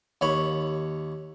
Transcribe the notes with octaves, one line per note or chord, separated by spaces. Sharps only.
D#2 C#5 B5